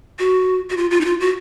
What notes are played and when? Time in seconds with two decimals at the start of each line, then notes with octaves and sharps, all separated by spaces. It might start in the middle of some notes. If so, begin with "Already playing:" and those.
0.19 F#4
0.70 F#4
0.77 F4
0.91 F4
1.01 D#4
1.05 F4
1.20 F#4